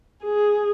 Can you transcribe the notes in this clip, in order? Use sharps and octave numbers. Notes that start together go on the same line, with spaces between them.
G#4